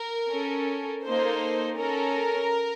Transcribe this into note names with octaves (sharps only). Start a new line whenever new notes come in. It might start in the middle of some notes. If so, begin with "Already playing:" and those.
Already playing: A#4
C#4 A4
A#3 D#4 A4 C5
C#4 A4 A#4